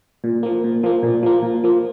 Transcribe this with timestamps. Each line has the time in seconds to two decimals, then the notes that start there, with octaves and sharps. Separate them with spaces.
0.24 A#2
0.43 F3 A#3
0.64 A#2
0.83 F3 A#3
1.03 A#2
1.23 F3 A#3
1.43 A#2
1.64 F3 A#3